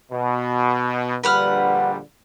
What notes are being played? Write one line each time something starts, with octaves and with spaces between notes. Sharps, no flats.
B2
A#1 D3 G3 B4 F#5 F6